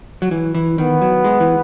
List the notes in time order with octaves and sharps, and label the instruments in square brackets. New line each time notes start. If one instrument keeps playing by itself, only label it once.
[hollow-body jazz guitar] F#3
E3
E3
[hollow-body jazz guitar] D#3 [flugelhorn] B3
[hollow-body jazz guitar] F#3
G#3
E3